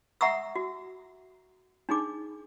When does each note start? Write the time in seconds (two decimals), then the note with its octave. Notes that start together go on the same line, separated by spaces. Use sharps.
0.21 E5 F#5 A#5 C#6 D#6 E6
0.56 F#4
1.89 D4 D#4 G#4 D6